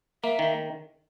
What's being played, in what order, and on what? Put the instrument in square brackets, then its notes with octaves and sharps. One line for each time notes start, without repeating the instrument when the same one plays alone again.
[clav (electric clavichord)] A#3 [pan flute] E5
[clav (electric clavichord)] D#3